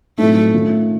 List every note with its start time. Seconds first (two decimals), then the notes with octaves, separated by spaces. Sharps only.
0.18 A2 F#3 A3 C4 D#4
0.53 D#3 A3 C#4 F4